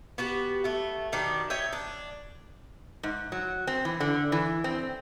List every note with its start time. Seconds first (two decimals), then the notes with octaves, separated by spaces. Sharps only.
0.18 B3 F#4 G4
0.64 A3 B3
1.12 B2 D#3 D4 G4
1.50 C#5 D#5 E5 G5
1.73 D4
3.03 G#2
3.32 F#3
3.67 C4
3.85 E3
4.00 D3
4.32 E3
4.64 C4